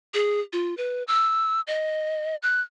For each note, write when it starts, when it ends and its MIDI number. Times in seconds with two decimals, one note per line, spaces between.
0.14 0.40 68
0.53 0.77 65
0.77 1.03 71
1.08 1.61 88
1.67 2.36 75
2.43 2.61 90